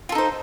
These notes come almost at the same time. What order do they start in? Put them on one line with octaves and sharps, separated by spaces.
F4 A4 D#4 C5